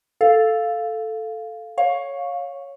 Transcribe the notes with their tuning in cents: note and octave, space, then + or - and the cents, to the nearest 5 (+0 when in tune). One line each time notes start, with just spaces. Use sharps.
A4 +0 F5 +0
C#5 +0 F5 +20 C#6 +0